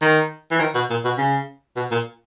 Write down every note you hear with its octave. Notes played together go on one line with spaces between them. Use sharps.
D#3
E3
D#3
B2
A#2
B2
C#3
B2
A#2